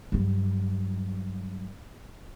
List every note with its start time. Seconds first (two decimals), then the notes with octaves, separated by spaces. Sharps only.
0.12 G2 F#3